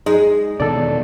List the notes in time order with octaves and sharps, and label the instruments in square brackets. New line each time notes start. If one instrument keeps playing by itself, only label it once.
[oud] G#3 [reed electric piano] D#4
[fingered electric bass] E2 B2 D#3 [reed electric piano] A4 D5